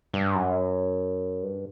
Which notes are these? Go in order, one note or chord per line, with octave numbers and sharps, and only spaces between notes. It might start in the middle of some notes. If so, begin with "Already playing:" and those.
G2
F#2
G2